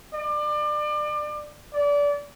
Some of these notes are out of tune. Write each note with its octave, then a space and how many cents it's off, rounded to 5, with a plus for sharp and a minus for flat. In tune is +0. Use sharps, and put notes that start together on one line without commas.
D5 +30
D5 -25